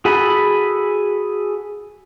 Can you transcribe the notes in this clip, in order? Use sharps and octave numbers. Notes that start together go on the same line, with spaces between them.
F#4 G#4 A4 G#5 B5